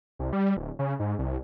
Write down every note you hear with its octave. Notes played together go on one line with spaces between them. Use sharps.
C2
G3
D1
C#3
G#2
C2